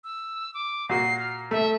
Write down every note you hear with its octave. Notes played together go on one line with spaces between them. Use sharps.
E6
D6
A#2 F#4 C7
F6
A3 E5